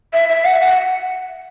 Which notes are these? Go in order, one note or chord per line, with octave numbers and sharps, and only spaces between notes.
E5
E5
F#5
F#5